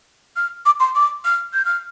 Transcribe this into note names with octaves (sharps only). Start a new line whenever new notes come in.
F6
D6
C6
D6
F6
G6
F6